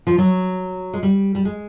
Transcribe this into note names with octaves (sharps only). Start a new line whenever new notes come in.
F3
F#3
G#3
G3
G3
G#3